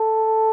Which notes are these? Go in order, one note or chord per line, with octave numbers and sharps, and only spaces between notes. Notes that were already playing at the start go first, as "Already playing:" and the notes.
Already playing: A4